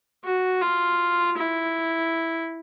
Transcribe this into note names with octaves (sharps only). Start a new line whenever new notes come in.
F#4
F4
E4